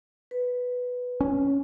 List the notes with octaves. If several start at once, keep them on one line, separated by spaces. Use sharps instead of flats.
B4
C#4